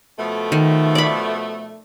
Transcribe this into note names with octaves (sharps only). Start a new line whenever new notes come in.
B2 F3 A3
D#3
D5 B5